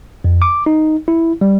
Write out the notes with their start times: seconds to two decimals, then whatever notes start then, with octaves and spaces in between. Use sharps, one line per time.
0.24 F2
0.42 D6
0.66 D#4
1.08 E4
1.41 G3